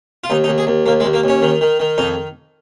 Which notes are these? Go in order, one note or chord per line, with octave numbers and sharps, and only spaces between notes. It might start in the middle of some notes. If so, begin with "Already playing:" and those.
F4
D#2 D#4
D#4
D#2
G#4
D#2
D#2 A#3
G#3
D#2
A#3
D#2 C#4
D#3
D#3
D#3
F2 D#4